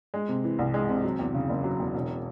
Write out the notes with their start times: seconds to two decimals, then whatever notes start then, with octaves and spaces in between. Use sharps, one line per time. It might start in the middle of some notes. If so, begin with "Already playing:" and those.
0.14 G#3
0.29 C3
0.44 E3
0.59 C2
0.74 G#3
0.89 C3
1.04 F#3
1.19 E2
1.34 C#3
1.50 F#1
1.64 F#3
1.80 E2
1.94 E1